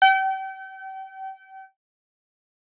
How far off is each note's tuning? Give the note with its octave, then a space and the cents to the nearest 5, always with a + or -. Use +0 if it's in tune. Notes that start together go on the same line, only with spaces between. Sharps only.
G5 -35